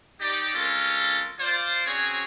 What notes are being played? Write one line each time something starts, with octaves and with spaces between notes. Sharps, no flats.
D#4 G4 D5
G#3 C4 C#4 F4 A4 A#4
F4 C5 D5
C4 C#4 F#4 G#4 C#5